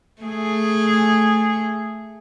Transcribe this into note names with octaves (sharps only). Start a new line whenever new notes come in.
A3 G#4